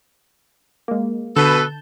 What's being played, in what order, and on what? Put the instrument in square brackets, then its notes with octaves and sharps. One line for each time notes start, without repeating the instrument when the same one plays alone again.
[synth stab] G#3 A#3
[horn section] B2 A4 B4 [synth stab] D3 A5 G6